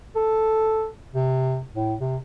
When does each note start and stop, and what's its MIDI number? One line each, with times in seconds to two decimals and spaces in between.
0.16 0.88 69
1.13 1.61 48
1.75 1.94 45
2.00 2.17 48